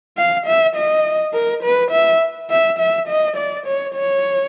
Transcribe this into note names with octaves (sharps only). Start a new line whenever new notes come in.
F5
E5
D#5
A#4
B4
E5
E5
E5
D#5
D5
C#5
C#5